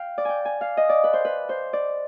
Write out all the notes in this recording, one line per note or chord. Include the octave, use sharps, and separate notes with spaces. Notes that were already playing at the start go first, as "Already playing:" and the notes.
Already playing: F5 G5
D5
G5 G#5
G#5
F5
D#5
D5
B4
C5
B4
C5
D5